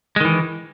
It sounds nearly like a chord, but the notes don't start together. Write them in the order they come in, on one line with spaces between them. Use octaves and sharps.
G#3 D#3 E3